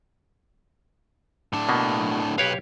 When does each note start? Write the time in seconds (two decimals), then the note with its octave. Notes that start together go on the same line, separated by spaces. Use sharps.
1.53 A2 D4
1.69 B2 A#3 B3
2.38 B1 G4 B4 C#5 F5